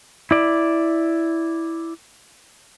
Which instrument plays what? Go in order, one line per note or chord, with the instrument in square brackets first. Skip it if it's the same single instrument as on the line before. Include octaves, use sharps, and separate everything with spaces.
[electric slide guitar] E4 D5